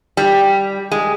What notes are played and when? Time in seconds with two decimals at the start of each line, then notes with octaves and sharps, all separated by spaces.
0.17 G3
0.91 G#3